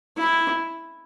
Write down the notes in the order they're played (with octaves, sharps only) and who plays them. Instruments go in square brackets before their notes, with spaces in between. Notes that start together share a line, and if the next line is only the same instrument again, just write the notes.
[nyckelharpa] E4